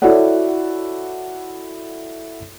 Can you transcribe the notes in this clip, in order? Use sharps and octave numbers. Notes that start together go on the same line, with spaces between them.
E4 F#4 A4 C#5 D5 F#5